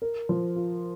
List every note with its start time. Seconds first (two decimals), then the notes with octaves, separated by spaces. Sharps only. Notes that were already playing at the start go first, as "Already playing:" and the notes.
0.02 A#4
0.29 F3
0.56 F4